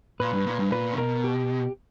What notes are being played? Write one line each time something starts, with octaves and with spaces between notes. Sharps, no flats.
A#2 B4
G2
A#2
G2
A#2 B4
C#3
B2 A#4
G4